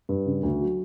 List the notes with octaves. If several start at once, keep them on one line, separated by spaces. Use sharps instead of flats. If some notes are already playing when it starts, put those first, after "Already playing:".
G2
C#3
D2
F#3